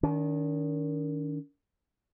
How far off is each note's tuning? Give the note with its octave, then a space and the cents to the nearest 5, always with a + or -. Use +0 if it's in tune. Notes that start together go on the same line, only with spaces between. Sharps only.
D#3 +0 D4 -45